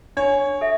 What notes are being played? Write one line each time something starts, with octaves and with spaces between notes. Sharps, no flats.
D4 C#5
A4 E5